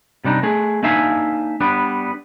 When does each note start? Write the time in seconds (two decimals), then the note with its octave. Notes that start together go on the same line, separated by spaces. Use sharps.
0.25 C3 G3 D4 D#4
0.43 A3 G#4
0.83 A#3 D4 D#4 E5 F5 G#5
1.61 G3 B3 D4